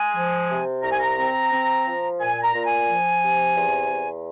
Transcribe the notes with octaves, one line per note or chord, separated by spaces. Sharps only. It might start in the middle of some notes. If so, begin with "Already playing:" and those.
Already playing: G#3 G#5
F3
C3
C2 A#5
G#5
A#5
C4
C4
F3
A#2 G#5
A#5
A#2
G#5
F3
C3
E2
E2